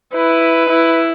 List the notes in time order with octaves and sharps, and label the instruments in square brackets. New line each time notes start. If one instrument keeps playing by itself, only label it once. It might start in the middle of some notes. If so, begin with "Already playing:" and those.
[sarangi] E4 [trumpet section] B4
[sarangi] E4